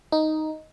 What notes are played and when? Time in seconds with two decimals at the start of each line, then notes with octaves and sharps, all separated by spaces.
0.12 D#4